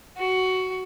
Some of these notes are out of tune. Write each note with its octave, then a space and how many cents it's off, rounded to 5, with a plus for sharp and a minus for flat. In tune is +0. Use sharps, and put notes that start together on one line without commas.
F#4 +10